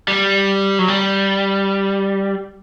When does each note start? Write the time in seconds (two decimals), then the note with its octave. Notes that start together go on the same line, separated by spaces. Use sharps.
0.08 G3
0.79 F#3
0.88 G3